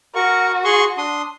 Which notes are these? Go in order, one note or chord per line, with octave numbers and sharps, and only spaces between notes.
F#4 A#4 C#6
G#4 C6 C#6
D4 C6 D#6